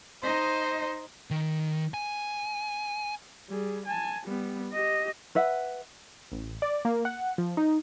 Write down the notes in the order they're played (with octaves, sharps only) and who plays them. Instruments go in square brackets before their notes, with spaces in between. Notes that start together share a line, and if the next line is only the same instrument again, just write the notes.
[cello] D#4 D#5 [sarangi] C5
[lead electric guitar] D#3
G#5
[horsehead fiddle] G3 G#4
G#5 A5
G3 B3
G4 D#5
[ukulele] B4 E5 F#5
[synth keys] A1
D5
A#3
F#5
F3
D#4